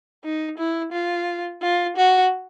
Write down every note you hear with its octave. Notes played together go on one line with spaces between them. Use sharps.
D#4
E4
F4
F4
F#4